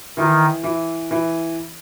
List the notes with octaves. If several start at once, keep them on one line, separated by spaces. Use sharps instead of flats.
D#3 E3
E3
E3